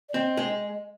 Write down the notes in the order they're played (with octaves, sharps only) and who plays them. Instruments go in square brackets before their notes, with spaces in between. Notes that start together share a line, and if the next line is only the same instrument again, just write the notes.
[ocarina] D5
[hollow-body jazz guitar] C4 [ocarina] D#5
[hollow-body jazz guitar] G#3